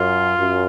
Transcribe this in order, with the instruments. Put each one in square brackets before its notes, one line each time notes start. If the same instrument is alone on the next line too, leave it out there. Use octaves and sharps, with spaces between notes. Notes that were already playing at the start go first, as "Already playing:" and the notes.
Already playing: [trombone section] F#2 [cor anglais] F4
[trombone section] F#2